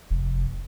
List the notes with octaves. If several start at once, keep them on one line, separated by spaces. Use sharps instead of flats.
F1